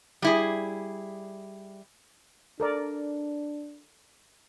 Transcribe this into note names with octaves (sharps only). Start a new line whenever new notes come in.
G3 E4 G#4
D4 A4 A#4 D5